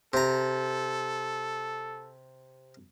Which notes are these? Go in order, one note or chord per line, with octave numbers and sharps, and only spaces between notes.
C3 A4 A#5